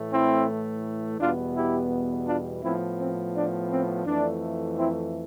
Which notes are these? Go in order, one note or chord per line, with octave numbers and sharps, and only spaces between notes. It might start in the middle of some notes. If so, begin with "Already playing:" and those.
Already playing: A2 E3 A3
C4 E4
E2 B2 G3 B3 D4 F4
E4 G4
D4 F4
A2 F3 B3 C4 E4
C4
D4
C4
F2 E3 A3 D4
C4 E4